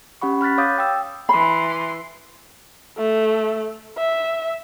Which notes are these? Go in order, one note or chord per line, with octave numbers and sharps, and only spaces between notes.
C#4 G4 F#5 B5 C#6
B5 F6 F#6 A6 B6
C#5 F5 D6 D#6 G6 A6
G5 E6
E3 B5 C6
A3
E5